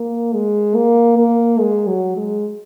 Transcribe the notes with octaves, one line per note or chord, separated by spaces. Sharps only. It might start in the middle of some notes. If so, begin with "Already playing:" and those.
Already playing: A#3
G#3
A#3
A#3
G#3
F#3
G#3